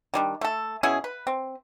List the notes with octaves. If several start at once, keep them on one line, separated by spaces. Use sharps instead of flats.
D#3 G3 D4
A3 A4
B2 C#4 E4 G#4
B4
C4